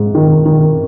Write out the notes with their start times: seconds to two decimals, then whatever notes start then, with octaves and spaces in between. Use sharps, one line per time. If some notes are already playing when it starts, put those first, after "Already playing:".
Already playing: G#2
0.15 D#3
0.46 D#3